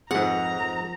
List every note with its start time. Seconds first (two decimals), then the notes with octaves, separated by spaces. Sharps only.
0.11 F2 G#2 G#4 B4 C5 F#5 A#5
0.57 F3 A#4